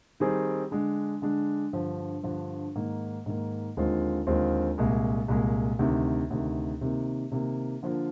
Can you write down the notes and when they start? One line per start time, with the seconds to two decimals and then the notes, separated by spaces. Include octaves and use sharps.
0.20 D#3 G3 C4 D#4 G#4
0.71 D3 G#3 D4
1.22 D3 G#3 D4
1.73 G2 D3 F3
2.23 G2 D3 F3
2.75 G#2 D#3 A#3
3.26 G#2 D#3 A#3
3.77 D#2 D3 G#3 C4 F4
4.27 D#2 D3 G#3 C4 F4
4.78 C2 A#2 G#3
5.28 C2 A#2 G#3
5.79 D2 C3 D#3
6.30 D2 C3 D#3
6.81 C3 D#3 A#3
7.32 C3 D#3 A#3
7.83 D3 F3 A#3 F4 A#4